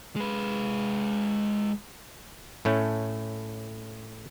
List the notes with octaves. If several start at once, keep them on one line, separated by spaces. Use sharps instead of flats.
G#3 B4
A2 A3 C#4